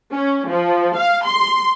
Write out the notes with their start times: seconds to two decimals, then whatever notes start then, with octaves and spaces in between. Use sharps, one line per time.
0.12 C#4
0.48 F3
0.97 F5
1.25 C6